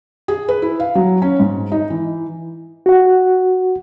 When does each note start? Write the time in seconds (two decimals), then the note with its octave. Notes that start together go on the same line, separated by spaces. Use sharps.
0.28 G#4
0.49 B4
0.62 E4
0.80 F5
0.95 F#3
1.22 C#4
1.40 G#2
1.72 D#4
1.90 E3
2.86 F#4 F#5